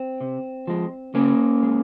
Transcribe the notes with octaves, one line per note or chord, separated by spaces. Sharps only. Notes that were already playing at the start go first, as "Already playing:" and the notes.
Already playing: C4
C3
F3 G#3
C#3 A#3 C#4
G#3